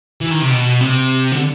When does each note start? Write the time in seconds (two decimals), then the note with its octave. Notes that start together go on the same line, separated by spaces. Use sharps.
0.21 E3
0.31 D#3
0.41 C3
0.50 B2
0.81 C3
1.32 D3